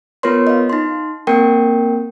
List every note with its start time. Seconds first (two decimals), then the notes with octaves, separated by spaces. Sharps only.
0.23 B3 F4 A#4 B4 C#5 C6
0.47 D#5 F5
0.70 D#4 C6
1.27 A#3 C4 A#4 G5